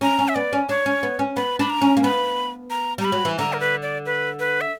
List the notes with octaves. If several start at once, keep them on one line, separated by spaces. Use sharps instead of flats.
C#4 A#5
C#4
E5
B3 D5
C#4
D4 C#5
C#4
B3
C#4
B3 B5
D4 B5
A#5
C#4
A#3
B3 B5
A#5
G3 A#5
B5
F#3
E3
D3 A#5
A#4
B4
D5
B4
B4
E5